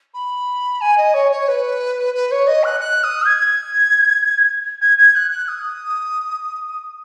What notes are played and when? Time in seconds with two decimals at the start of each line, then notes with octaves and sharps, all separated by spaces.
0.14 B5
0.81 G#5
0.97 D#5
1.13 C#5
1.31 C#5
1.48 B4
2.14 B4
2.31 C#5
2.47 D#5
2.64 F#6
2.80 F#6
3.03 D#6
3.26 G#6
4.81 G#6
4.98 G#6
5.15 F#6
5.31 F#6
5.48 D#6